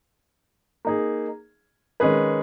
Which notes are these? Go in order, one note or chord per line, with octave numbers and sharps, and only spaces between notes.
A#3 D#4 G#4
D#3 G#3 C#4 G#4 B4